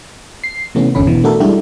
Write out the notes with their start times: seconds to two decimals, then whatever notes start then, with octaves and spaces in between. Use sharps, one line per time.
0.44 C7
0.75 C3 E3 A3 B3 C#4
0.95 G1 E2 D3 C#4 B5
1.07 B2 E3
1.24 A3 D4 F#4 A4 A#4
1.40 G3 G#3 D4 E4 F#4 G4